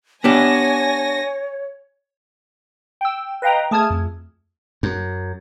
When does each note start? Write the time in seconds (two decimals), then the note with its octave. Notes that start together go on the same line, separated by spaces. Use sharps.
0.24 B3 D4 G4 C#5 G#5 A#6
3.01 G5 E6
3.42 B4 D#5 F5 G5 A#5
3.71 A3 G#4 A5 D#6 F6 G#6
3.90 F2
4.83 F#2